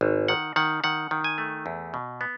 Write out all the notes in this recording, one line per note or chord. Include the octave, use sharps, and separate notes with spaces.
G#1
D#3 F#5
D#3 F#5
D#3 F#5
D#3
G#5
A3
E2
B2
B3